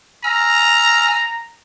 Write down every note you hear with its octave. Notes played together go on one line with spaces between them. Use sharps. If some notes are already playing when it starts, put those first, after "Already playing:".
G#5 A#5 E6 F6